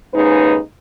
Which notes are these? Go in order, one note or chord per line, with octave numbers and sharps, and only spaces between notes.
D#2 G#2 C#3 D#4 B4